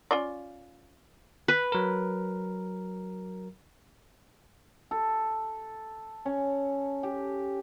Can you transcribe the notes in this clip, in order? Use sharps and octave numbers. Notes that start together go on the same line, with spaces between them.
C#4 F4 D5
B4
F#3 A#4
A4
C#4
G4